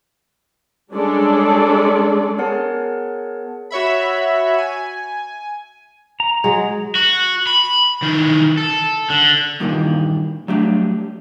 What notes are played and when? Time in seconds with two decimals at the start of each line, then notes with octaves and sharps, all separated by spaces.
0.92 G3 G#3 C#4 D4 A4 D5
2.38 B3 G#4 A#4 C#5 F#5 A5
3.71 F#4 C#5 E5 B5
4.58 G#5
6.20 A#5
6.44 F#3 G#3
6.95 F#4
7.47 B5
8.02 D#3 E3
8.58 A4
9.10 D3
9.60 G2 A#2 D#3 E3 G3 A#3
10.48 F#3 G3 A3 D4